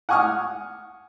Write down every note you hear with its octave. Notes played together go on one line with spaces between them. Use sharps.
F#5 G#5 C#6 D#6 F6